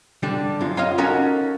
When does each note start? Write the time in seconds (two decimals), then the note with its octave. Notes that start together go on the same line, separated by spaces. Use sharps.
0.23 D3 G3 D4
0.61 F#2 F4
0.77 F4 C#5 D#5 F5
0.98 C#4 D#4 F#4 A4 A#4